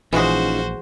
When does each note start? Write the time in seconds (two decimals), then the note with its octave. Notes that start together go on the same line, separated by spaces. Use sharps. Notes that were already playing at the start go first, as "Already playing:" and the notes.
0.13 A#1 E3 G#3 C#4 D#4 F4 F#4 C5